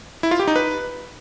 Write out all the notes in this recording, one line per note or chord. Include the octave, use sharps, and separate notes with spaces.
E4
F4
G4
D#4
B4